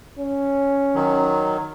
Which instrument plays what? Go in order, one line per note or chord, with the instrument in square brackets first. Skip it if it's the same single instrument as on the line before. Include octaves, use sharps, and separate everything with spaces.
[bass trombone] C#4
[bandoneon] D#3 F#3